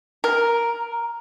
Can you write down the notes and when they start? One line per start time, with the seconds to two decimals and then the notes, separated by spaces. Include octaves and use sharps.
0.24 A#4